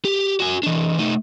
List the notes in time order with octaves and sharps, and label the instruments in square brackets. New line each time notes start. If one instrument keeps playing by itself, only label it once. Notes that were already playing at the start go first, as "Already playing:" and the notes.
[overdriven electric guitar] G4
F#4 G#5
E3 D4
A3 D#4